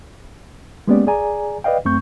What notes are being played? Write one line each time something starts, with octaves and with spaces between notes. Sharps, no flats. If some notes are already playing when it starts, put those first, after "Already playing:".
G#3 A#3 B3 C#4 G4 D5
G#4 D5 G#5 A#5
B4 D5 D#5 F5 G5
F#2 A3 C4 C#6 G6